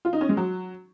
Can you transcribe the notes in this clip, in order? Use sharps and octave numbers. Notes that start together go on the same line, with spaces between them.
F4
D#4
C#4
G#3
F#3